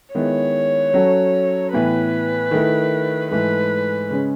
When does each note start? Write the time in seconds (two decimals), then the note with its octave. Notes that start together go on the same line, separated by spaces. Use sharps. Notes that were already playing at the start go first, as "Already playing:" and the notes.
0.14 D#3 G#3 B3 E4 C#5
0.94 F#3 C#4 F#4 A4
1.72 A2 E3 B3 B4
2.51 D#3 A3 E4
3.31 G#2 E3 A3 B4
4.11 C#3 G#3 C#4